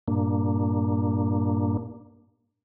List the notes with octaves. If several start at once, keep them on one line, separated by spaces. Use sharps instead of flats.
G2 A#2 A#3 D4